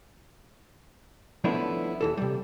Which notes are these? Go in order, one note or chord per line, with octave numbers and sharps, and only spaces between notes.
F3 A3 B3 C#4 D4 E4
D#2 E3 A4
C3 G3